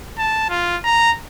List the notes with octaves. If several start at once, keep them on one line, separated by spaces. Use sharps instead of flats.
A5
F4
A#5